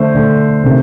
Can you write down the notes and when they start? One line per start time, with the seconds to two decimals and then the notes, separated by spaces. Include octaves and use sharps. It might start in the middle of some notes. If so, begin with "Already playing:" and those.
Already playing: D3 A3 C5
0.15 D3 A3
0.64 C3 D#3 A3